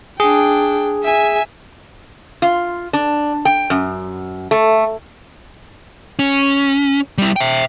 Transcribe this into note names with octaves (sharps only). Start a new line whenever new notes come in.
D4 G#4 G5
E5 G#5
F4
D4
G5
F#2
A3
C#4
G3 E4
E5 G5